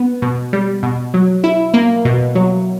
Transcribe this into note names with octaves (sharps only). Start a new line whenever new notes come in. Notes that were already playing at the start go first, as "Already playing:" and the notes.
Already playing: B3
B2
G3
B2
F#3
E4
A#3
B2
F#3